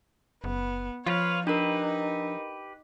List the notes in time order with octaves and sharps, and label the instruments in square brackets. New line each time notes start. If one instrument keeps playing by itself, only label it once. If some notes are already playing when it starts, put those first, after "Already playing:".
[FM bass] F#1 [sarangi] B3
[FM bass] F3 [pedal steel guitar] F4 B4 F5 [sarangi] C#5
[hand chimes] D4 A#4 [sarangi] D#4 [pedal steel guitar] G4 B4